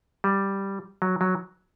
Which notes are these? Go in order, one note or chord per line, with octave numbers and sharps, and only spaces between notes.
G3
F#3
F#3